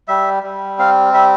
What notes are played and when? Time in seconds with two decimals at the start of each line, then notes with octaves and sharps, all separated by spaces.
0.08 G3 E5
0.43 G3
0.79 C4 F5
1.14 G3 E5